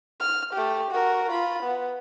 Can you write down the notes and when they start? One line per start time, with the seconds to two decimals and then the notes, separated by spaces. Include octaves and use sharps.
0.20 F6
0.54 A3 G4
0.91 F#4 A#4
1.31 F4 B5
1.63 B3